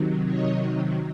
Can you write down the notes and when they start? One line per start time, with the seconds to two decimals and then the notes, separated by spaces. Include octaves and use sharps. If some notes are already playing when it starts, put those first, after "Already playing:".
Already playing: C3 D#3 F#3
0.25 C#5 D#5